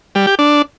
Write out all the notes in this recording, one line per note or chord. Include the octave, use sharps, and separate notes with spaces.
G3
G4
D4